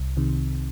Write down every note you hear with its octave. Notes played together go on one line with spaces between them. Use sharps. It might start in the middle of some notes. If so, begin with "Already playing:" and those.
Already playing: C2
C3 D#3